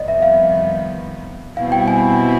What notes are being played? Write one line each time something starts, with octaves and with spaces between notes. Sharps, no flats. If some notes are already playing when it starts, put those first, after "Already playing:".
Already playing: F2 C3 D#3 G3 B3 D5 D#5
E5
F5
B2 G3 C4 E4 F5
G5
G#5